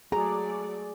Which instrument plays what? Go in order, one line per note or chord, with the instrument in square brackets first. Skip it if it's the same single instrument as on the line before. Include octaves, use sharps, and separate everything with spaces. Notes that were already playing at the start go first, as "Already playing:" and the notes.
[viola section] F#3 A3 D5 [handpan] G#4 [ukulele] A#5